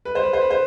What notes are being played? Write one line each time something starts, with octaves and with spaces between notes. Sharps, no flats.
B4
C5
B4
C5
B4
C5